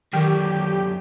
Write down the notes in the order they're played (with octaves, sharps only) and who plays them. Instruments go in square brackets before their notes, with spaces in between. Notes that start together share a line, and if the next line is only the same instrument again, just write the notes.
[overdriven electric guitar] F#2 D3 [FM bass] D#3 [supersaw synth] G4